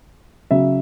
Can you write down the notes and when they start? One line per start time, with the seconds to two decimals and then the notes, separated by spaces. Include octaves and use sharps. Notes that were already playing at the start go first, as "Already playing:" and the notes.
0.50 C#3 F#3 E5